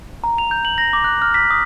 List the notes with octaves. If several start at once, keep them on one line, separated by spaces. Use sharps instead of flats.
A#5
F7
G6
F#7
A#6
D6
F#6
F6
B6
D#6